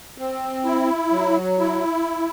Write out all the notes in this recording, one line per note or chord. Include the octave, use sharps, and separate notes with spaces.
C4
E4
F#3
E4